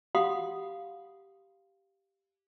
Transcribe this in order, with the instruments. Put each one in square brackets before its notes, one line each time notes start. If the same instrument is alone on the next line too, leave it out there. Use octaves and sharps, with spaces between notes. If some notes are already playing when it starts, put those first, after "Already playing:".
[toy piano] G4 F5 F#5 B5 C6 D#6